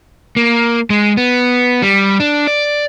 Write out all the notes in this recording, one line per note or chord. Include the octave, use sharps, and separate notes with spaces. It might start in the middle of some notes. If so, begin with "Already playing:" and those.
A#3
G#3
B3
G3
D4
D5